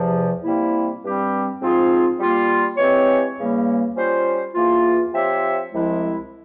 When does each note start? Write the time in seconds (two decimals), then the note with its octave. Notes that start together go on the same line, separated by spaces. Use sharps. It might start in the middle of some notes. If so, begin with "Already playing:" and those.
Already playing: E2 C3 F3
0.43 C3 G3 A#3 E4
1.02 G2 G3 C4 G4
1.61 G#2 F3 C4 F4 G#4
2.19 G3 A#3 F4
2.77 E3 G#3 C4 G4 C#5
3.37 E2 C#3 G3 A#3
3.96 G3 C#4 F4 C5
4.54 E2 E3 A#3 F4
5.13 F3 C4 G4 C#5 E5
5.72 C2 C3 F3 G#3 E4